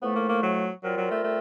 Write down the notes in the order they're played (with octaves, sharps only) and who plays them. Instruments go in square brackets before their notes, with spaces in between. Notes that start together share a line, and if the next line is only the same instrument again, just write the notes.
[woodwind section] A2 F3 A3 [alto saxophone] B3
[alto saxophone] A#3
A#3
F#3
[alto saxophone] F#3 [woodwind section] G3 C4 F4 A#4
[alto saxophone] F#3
A3
A3